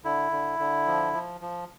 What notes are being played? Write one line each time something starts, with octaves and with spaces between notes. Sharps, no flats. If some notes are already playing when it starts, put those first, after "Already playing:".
D3 E4
D3
D3
F3
F3
F3